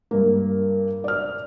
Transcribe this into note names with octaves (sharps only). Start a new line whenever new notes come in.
G2 A#3
D5 F6